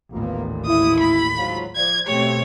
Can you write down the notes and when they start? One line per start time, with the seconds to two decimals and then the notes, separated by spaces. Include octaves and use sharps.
0.12 A1 D#2 A#2 A#3 B3 F4
0.66 E4 D#6
1.00 B5
1.37 G#2 F#3 F4
1.76 F3 C5 D5 G#6
2.07 B2 A3 C4 G4 C#5